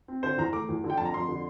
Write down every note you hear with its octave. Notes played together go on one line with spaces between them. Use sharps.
C4
D3 C5
E2 A#5
A3 D6
E2
D3
G5
F2 A5
A#5
F2 C6
D3